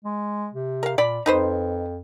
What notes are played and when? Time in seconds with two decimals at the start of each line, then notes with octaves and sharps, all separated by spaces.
0.05 G#3
0.54 C3
0.83 A#4 F5
0.98 A#2 D5 B5
1.26 F2 D#4 B4 C5